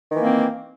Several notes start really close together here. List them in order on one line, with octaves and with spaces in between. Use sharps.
D#3 E3 A#3 C4